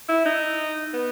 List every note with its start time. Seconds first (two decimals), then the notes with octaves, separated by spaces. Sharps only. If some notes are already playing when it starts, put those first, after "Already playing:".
0.09 E4
0.25 D#4
0.93 B3